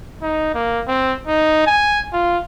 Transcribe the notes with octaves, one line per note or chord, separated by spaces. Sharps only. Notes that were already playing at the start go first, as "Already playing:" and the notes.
D#4
A#3
C4
D#4
G#5
F4